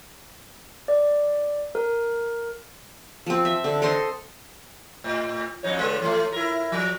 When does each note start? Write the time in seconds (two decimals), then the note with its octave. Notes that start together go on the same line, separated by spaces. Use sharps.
0.88 D5
1.75 A#4
3.26 F3 C4
3.45 E5
3.64 D3
3.82 A4 C5 D#5 C6
5.04 A2
5.63 F2 D#4 C#5
5.79 D3 G#3 B3
6.02 E3 A3
6.32 E4 A#4
6.72 F3